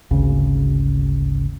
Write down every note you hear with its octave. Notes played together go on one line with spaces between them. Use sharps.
G#1 D2 C#3